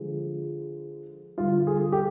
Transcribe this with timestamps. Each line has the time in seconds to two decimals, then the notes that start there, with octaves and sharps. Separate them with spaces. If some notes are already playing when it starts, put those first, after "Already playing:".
Already playing: D3 F3 G#3
1.38 D3 G3 F4
1.67 G#4
1.92 G4